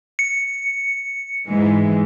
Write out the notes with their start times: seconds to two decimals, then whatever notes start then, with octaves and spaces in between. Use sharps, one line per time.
0.19 C#7
1.49 G#2 E3 G#3